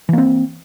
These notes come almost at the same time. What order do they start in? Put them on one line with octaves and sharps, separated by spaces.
E3 A#3 C4